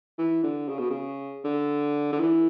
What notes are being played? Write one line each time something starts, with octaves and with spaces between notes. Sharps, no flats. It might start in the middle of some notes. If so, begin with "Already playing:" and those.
E3
D3
C#3
B2
C#3
D3
D3
E3